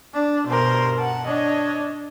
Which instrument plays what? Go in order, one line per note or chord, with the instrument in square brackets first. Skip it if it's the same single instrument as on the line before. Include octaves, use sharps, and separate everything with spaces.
[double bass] D4
[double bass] G2 B2 [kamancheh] A#4 C5
[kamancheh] F#5 A5
[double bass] D4 [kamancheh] C#5 D#5